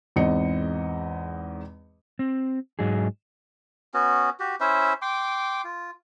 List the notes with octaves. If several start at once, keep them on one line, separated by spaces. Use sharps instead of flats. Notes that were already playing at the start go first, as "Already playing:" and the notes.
E2 G#2 C4 D#5 C#7
C4
G#2 F#3 D#4 G#4
B3 C#4 F#4
F#4 G4
C#4 E4 C5 E5
G5 C6 D6
F4